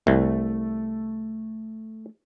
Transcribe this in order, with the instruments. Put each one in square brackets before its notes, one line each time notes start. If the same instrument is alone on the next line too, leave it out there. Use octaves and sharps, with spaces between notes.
[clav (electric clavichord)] C2 [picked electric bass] A3